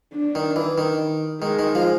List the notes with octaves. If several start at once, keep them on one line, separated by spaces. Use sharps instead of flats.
D4
D#3
E3
D#3
D#3 G#3
D#3
F3